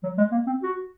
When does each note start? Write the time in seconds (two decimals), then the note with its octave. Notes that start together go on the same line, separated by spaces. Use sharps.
0.03 F#3
0.17 G#3
0.32 A#3
0.47 C4
0.63 F#4